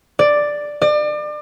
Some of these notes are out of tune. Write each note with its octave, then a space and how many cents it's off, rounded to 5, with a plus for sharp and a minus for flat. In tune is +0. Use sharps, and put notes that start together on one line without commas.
D5 +5
D5 +35